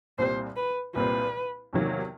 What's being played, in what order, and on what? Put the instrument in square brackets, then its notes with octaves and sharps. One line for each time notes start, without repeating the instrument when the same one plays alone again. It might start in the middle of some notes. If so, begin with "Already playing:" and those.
[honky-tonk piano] C2 A#2 G3 C4 [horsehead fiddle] C5
[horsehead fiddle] B4
[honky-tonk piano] C2 A#2 G3 C4 [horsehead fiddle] B4
[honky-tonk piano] E2 C3 D#3 F#3 A#3